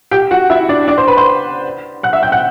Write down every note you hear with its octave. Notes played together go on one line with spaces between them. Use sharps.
G4 G5
F#4 F#5
E4 E5
D4 D5
D4 D5
C5 C6
B4 B5
C5 C6
F#5 F#6
E5 E6
G5 G6
F#5 F#6